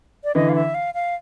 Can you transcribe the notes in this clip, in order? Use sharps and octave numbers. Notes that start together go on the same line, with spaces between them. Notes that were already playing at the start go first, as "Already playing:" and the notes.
D5
D3 E3 D#5
F5
E5
F5
F5